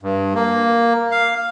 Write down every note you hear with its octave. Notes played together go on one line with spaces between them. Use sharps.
G2
A#3
F5